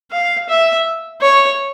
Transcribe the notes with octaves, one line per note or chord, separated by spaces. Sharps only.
F5
E5
C#5